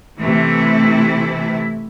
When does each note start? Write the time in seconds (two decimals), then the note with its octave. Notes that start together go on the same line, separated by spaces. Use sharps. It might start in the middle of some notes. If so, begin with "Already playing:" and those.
0.19 C3 E3 A3 E4